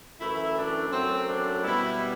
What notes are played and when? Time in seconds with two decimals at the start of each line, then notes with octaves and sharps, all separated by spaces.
0.20 F#2 E3 A3 E4
0.56 D4
0.91 F#2 F#3 A3 C4
1.26 D4
1.63 B2 G3 E4